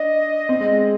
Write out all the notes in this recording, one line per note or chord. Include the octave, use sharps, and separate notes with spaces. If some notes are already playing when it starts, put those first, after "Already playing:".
Already playing: D4 D#5
C4
G#3
G#3